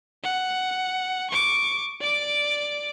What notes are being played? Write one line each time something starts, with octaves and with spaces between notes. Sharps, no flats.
F#5
C#6 D6
D5 D6